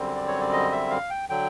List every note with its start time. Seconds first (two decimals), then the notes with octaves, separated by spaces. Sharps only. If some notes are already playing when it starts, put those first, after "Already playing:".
Already playing: F#2 D3 G3 C4
0.16 D5
0.28 C#5
0.40 D5
0.53 D#5
0.72 E5
0.90 F5
1.10 G5
1.29 D3 F#3 G5